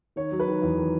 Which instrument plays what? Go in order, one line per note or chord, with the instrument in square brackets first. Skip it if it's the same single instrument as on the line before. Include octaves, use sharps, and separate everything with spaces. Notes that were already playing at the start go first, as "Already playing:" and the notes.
[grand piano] D#3 C#5
F#3
B4
D#3
E2
D#3